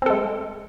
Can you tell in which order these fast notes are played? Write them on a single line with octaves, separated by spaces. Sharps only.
C4 A4 G#3